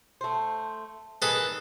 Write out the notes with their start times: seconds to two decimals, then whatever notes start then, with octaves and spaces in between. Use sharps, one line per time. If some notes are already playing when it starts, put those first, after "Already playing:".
0.21 A3 C5
1.22 D#3 E3 G3 G#4 A4 B4